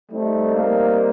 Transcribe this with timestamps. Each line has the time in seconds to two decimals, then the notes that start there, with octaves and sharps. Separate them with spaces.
0.11 G3 A3 C4 D#4
0.55 A#3